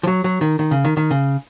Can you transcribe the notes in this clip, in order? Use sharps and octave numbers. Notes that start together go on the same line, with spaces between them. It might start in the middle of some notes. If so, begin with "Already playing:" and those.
F3
F#3
F#3
D#3
D#3
C#3
D#3
D#3
C#3